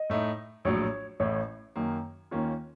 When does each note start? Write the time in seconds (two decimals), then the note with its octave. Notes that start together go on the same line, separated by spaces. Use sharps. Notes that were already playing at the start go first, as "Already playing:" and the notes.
Already playing: D#5
0.10 A2 A3 D#4
0.65 A#1 A2 F#3 C#5
1.20 A1 A2 A3 C#5
1.76 F#2 D#3 A#3
2.31 D#2 D#3 A#3 C#4 F4